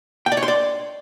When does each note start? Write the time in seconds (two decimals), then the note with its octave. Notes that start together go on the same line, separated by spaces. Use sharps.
0.26 G5
0.32 D5
0.37 C#5
0.43 C6
0.48 D5